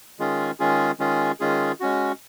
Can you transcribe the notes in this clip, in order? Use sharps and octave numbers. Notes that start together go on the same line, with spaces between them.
D#3 G#3 C#4 F4 G#4
D#3 G#3 C#4 F4 G#4
D#3 G#3 C#4 F4 G#4
D#3 G#3 C#4 F4 G#4
G#3 C#4 F#4